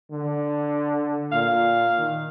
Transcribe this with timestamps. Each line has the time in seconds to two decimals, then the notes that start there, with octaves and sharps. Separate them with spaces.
0.11 D3
1.32 A#2 F5
1.98 D#3